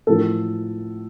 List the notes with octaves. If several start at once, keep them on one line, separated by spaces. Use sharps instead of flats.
A2 F3 A4